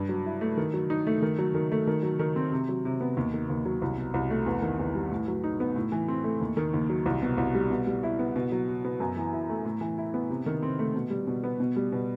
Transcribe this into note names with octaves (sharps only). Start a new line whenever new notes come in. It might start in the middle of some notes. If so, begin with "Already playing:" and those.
Already playing: G2
F#3
E4
A3
D#3
F#3
D#4
A3
D#3
F#3
D#3
A3
D#3
F#3
D#3
C4
C3
F#3
C3
B3
D#2
D#3
D#2
F#3
C2
B2
C2
A3
E2
D#3
E2
G3
A2
F#3
D#4
B3
A2
E3
C4
A3
D#2
D#3
D#2
F#3
C2
B2
C2
G3
B2
G3
E4
B3
B2
F#3
F#4
B3
F#2
E3
E4
A3
A2
E3
E4
B3
C3
D#3
C4
A3
B2
G3
B2
B3
B2
G3
B2